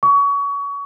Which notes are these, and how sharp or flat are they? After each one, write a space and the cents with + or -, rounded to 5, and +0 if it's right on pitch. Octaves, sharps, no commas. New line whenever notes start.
C#6 +30